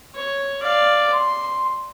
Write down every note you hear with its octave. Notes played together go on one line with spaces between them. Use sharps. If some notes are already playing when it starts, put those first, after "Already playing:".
C#5
D5 F5
C6